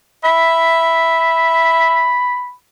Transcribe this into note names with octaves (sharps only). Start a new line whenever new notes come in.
E5 B5